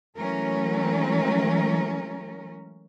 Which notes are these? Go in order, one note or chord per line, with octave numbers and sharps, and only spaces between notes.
E3 F#3 G#3 A3 C#4 A#4